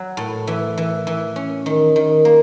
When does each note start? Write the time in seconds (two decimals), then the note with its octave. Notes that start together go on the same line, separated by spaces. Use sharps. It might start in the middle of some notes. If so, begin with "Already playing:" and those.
Already playing: F#3
0.17 A2
0.47 E3
0.78 E3
1.07 E3
1.36 C#4
1.66 D#3
1.96 D#3
2.25 A#3